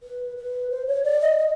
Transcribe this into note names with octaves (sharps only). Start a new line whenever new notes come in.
B4
B4
C5
C#5
D5
D#5
D#5